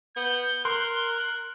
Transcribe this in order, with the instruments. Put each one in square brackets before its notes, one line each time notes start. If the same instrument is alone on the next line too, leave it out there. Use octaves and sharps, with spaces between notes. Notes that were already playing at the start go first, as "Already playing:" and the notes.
[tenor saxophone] B3 [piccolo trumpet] G6
[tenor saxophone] A#4 [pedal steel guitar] C6 [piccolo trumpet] F#6